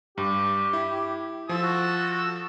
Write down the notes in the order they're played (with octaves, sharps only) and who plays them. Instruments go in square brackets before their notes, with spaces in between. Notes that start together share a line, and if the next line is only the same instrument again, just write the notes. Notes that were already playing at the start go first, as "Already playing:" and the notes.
[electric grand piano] G2 [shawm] G4
[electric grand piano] E4
[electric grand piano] F3 F4 [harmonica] A5 E6
[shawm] F#4